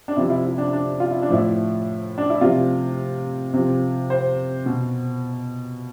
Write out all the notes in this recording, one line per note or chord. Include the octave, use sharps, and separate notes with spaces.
D4
C3 F3 E4
E4
E4
D4
D4
F4
E4
D4
A2 F3 E4
D4
E4
C3 F3 F4
C3 F3
C5
B2